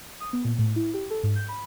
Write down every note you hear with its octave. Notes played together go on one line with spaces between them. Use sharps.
D#6
B3
A#2
A2
E4
G4
A4
G#2
G6
B5